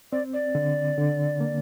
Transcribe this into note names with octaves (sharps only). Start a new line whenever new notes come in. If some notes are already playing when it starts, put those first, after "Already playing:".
C4 D5
D5
D3
D3
A#3